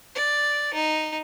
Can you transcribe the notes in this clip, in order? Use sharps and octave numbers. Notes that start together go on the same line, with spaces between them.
D5
D#4